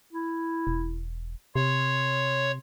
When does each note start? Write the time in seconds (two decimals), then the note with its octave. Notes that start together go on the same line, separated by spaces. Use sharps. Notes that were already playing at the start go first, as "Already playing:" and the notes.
0.13 E4
0.67 E1
1.56 C3 C#5 C6